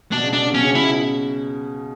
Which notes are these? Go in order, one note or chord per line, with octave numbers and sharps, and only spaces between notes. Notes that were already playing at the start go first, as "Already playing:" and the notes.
B2 D4
C#3
B2 D4
C#3
B2 C#4
C#3
B2 E4